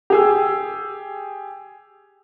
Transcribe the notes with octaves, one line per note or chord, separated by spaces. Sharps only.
G4 G#4 E6